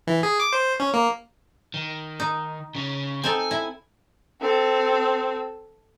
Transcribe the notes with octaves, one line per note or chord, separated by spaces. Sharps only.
E3
G#4
D6
C5
C#4
A#3
D#3
D#4
C#3 C#4
C4 D#4 A4 G#5
E4
C4 A4